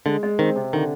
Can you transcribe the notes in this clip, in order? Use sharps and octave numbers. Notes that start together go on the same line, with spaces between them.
D3 G#3
G#3
D#3 C4
C3
D3 D#3